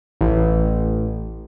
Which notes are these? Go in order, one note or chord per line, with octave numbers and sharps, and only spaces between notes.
A1